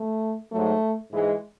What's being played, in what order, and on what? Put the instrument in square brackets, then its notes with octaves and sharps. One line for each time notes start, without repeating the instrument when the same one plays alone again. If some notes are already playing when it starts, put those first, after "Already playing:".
Already playing: [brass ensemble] A3
G#2 F#3 A3
G#2 E3 G#3